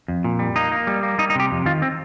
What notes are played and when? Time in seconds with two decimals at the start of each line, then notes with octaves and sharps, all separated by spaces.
0.08 F2
0.24 A#2
0.39 G3
0.56 A#3 D#4
0.72 A#3
0.87 G3
1.03 A#3
1.18 G3 D#4
1.30 D#4
1.35 C3 G4
1.51 F2
1.66 D#3 F4
1.82 C4